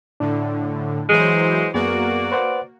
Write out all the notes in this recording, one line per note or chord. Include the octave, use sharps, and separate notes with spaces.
A2 D3 D4
E3 F#3 G#3 C5
F#2 A#3 B3 F#4 G#4 D5
B4 C5 F#5